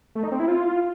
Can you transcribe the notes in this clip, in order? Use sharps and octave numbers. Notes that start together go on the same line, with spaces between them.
A3
D#4
C4
E4
F4